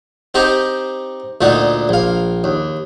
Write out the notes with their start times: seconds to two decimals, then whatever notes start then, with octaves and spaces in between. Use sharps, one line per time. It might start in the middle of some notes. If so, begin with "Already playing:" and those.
0.34 C4 D#4 G4 C5 A#5
1.41 D2 A#2 D#4 F#4
1.89 A#1 F5
2.44 D#2